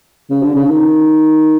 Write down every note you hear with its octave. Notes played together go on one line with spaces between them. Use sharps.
C#3
D3
C#3
D#3